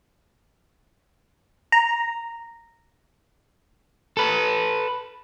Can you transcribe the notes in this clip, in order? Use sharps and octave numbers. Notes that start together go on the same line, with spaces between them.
A#5
A4 B4